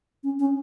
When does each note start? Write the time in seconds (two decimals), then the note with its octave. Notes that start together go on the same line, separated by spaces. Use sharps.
0.23 C#4
0.39 C#4